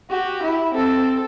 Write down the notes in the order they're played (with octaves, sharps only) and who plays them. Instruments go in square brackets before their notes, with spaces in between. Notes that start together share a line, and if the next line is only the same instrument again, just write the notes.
[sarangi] F#4 [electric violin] G4
[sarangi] E4
[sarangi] C4 [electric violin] A4